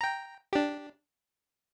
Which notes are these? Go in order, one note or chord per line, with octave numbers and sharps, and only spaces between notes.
G5 A#5
D4 G4